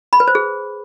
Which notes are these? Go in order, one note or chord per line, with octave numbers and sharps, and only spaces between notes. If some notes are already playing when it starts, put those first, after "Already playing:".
B5
B4
C5
G#4